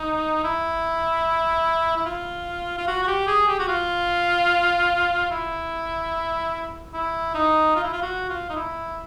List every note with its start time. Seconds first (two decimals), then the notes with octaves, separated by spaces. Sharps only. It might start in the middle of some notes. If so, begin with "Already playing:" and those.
Already playing: D#4
0.44 E4
1.97 E4
2.06 F4
2.78 F4
2.87 F#4
3.03 F#4
3.07 G4
3.27 G#4
3.48 G4
3.59 F#4
3.68 F4
5.31 E4
6.94 E4
7.35 D#4
7.75 F4
7.84 E4
7.93 F4
8.02 F#4
8.29 F4
8.50 D#4
8.56 E4